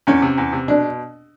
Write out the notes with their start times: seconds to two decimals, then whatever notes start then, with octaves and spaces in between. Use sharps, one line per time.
0.07 E2 C#4
0.22 C3
0.38 E2
0.53 C3
0.68 B2 D4